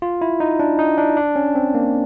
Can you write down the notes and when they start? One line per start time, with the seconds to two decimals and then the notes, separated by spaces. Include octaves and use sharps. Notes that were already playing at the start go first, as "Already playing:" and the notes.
0.02 F4
0.21 E4
0.40 D#4
0.60 D4
0.79 D#4
0.98 D4
1.17 D4
1.36 C#4
1.55 C4
1.74 A#3